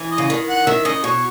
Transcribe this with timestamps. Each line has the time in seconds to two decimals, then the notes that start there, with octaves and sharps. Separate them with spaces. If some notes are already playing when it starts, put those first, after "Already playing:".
Already playing: E3
0.11 D#5
0.18 C#3
0.30 D#3
0.49 F#5
0.67 D#3 E5
0.85 C#3 D#5
1.04 B2 C#5